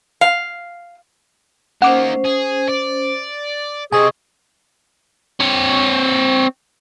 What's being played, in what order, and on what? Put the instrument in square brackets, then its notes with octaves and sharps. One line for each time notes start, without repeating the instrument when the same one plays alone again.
[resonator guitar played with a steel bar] F5
[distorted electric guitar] A#3 D#4 [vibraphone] C#4 C5 [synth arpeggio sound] F#5 D6
[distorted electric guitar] G#4
D5
[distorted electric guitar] C3 C4 [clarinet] G#4 [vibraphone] D#5 C#6 [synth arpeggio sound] G#5
[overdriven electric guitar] C4 C#5